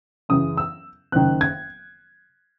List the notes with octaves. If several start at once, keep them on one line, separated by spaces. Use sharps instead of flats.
F#2 C#3 E3 D#6
E6
F#1 F#2 D#3 F#6
G#6